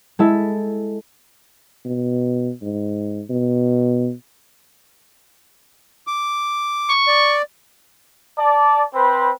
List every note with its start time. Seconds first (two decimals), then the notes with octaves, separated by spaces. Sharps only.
0.19 G#3 E4 A4 E5
1.85 B2
2.62 G#2
3.30 B2
6.07 D6
6.89 C#6
7.08 D5
8.37 D5 A5
8.93 C4 B4 C5 B5